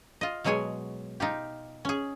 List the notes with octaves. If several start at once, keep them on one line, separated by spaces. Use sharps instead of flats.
F4 D#5
B2 F#3 G#3 G#4 C#5 G#5
D#4 F4 G4
C#4 G#4